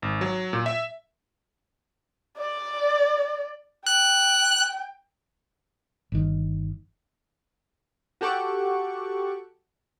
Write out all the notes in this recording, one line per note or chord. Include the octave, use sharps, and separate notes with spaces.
G#1
F#3
A#2
E5
D5
G5 F#6
G1 D#3
F#4 G4 A4 F#5 C#6 D6